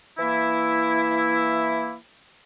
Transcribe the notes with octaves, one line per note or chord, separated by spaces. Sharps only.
E3 A#3 E4